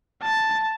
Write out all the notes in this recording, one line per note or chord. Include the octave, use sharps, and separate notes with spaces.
A5